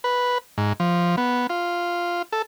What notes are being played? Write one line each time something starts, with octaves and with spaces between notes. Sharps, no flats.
B4
G#2
F3
B3
F4
A4